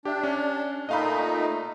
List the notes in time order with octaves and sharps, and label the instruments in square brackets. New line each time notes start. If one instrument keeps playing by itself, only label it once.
[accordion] D4 [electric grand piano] G4 E5
[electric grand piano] C#4
[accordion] A#2 A3 D#4 [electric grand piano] D#5 F5 B5